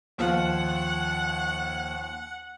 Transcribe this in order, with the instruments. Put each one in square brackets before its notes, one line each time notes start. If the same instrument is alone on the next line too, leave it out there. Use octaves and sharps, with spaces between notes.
[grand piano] D#2 F3 F4 [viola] F#5